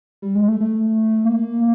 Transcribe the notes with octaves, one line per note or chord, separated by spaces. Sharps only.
G3
G#3
A3
A3
A#3